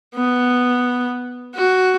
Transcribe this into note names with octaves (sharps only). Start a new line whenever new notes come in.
B3
F#4